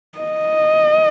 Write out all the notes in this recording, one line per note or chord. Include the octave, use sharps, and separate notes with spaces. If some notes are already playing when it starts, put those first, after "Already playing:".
D#5